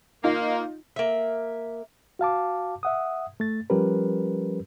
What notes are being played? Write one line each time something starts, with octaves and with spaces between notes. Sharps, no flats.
A#3 D#4 F4
A#3 E5
F#4 F5 A5 D6
E5 F#5 D#6
A3 A6
F3 G3 C#4 G4 A#4 B4